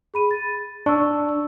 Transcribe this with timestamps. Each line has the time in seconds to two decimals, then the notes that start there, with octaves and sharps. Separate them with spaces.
0.14 G#4 B5 D#7
0.31 A6
0.86 D4 C#6 E6